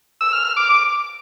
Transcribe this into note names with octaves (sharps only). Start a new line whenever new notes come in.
E6
F6
F6
D6